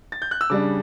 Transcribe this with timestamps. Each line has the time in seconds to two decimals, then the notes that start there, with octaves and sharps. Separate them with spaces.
0.12 A6
0.22 G6
0.31 F#6
0.41 E6
0.50 C#3 G3 D4 D6